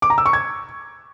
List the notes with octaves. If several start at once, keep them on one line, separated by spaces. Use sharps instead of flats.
D6
A#5
E6
C#6
G#6